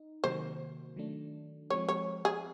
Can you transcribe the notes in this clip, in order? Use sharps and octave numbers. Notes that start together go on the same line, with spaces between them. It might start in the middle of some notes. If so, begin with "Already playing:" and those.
Already playing: D#4
C3 D#3 F#3 A#3 C5
D#3 F#3 A3 D4
F3 G#3 C4 C#5
C#5
G#4